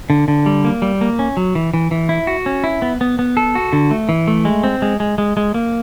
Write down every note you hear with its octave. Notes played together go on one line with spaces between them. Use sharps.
D3
D3
G3
A#3
G3
A#3
C#4
F#3
E3
E3
E3
E4
F#4
C#4
E4
B3
B3
B3
A4
F#4
D3
A3
E3
A3
G#3
C4
G#3
G#3
G#3
G#3
A#3